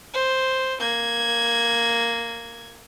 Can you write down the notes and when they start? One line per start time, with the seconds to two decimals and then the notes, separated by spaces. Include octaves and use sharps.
0.14 C5
0.80 A#3 G#6